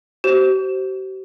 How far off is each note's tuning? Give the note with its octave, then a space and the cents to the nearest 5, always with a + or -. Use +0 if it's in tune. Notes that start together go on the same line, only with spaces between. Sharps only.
G4 -45 C5 +0